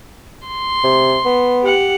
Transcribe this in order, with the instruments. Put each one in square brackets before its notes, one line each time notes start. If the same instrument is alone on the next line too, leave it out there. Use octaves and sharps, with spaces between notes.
[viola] C6
[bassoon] C3
B3
[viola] G4 F#5